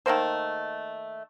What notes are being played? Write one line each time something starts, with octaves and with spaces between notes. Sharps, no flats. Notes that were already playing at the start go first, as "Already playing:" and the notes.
D#3 A3 A#3 C5